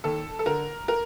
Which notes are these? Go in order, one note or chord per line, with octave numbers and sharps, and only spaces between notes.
D#2 A4
A4
D3 A#4
A#4